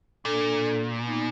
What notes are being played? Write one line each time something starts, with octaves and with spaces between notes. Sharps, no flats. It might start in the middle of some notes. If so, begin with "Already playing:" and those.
A#2 D4 A4
B3 D#4